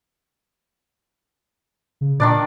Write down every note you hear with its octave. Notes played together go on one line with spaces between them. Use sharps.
C#3
A#2 D#3 D4 D5